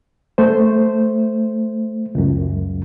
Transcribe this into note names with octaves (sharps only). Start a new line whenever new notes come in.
A3 C5
C#2 F#2